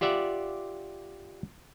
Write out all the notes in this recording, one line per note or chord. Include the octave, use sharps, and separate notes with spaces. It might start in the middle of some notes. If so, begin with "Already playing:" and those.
F4 G4 D5 E5 F#5